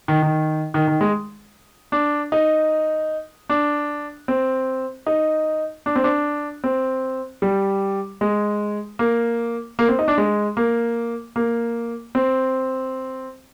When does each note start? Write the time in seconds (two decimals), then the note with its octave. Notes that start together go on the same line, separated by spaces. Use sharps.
0.08 D#3
0.23 D#3
0.74 D#3
0.87 D#3
1.01 G#3
1.92 D4
2.32 D#4
3.49 D4
4.28 C4
5.07 D#4
5.86 D4
5.96 C4
6.04 D4
6.64 C4
7.42 G3
8.21 G#3
8.99 A#3
9.79 A#3
9.88 C4
9.99 D#4
10.08 D4
10.18 G#3
10.57 A#3
11.36 A#3
12.15 C4